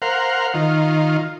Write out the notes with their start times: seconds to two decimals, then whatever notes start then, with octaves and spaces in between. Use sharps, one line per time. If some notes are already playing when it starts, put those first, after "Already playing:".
0.02 A#4 C5 F5 F#5
0.54 D#3 F4